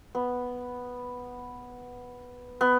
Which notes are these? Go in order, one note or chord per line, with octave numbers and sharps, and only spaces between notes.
B3
B3